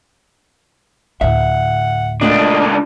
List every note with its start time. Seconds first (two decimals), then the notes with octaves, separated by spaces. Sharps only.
1.21 D2 A2 E5 F#5
2.21 C#2 A#2 A3 A#3 D4 D#5